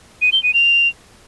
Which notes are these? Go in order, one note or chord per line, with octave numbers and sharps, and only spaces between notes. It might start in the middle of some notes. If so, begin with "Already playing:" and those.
D#7
G7
D#7
F7